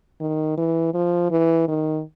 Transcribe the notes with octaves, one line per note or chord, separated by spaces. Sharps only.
D#3
E3
F3
E3
D#3